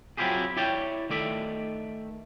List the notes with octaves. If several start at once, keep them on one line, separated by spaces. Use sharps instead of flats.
F#3 C4 E4 F4 G4 G#4
E4 G4 C#5 D5 G5
D#3 A3 D5 E5